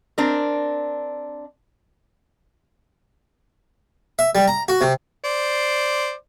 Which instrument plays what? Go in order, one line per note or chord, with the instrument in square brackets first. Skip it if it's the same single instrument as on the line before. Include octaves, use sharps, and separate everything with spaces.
[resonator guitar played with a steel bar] C4 D4 A#4
[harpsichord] E5
G3
A#5
F#4
C3
[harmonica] C5 D5